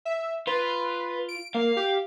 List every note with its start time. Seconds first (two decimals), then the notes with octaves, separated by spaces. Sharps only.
0.05 E5
0.47 F4 B4
1.29 D7
1.54 A#3 F5
1.77 G4